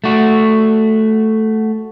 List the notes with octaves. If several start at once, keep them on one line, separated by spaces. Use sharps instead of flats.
A3 F#4